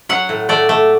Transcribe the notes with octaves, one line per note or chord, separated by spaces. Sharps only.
F#3 F#5
A2
A3 D5
A3